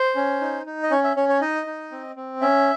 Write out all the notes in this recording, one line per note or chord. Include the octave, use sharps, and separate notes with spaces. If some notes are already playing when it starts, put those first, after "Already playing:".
Already playing: C5
C#4
D#4
D#4
D#5
C#4 C#5
E5
C#4 C#5
C#5
D#4 D#5
D#4
C4
C4
C#4 E5